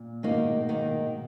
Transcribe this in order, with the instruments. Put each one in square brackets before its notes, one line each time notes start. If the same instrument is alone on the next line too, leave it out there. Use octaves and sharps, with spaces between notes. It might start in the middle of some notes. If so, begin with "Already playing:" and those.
Already playing: [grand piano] A#2
[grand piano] G#2 B2 [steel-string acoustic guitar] D#3 A#3 D#4
[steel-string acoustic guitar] D#3 A#3 D#4